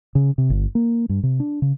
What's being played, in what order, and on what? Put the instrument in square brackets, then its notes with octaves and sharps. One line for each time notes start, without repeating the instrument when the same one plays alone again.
[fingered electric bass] C#3
C3
G1
A#3
G2
C3
D4
C#3